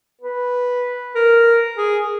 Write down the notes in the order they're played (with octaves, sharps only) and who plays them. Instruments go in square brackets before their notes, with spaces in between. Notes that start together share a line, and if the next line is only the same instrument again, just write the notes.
[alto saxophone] B4
A#4
G#4